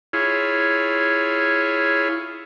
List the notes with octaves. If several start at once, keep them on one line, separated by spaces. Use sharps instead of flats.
E4 F4 G#4 C#5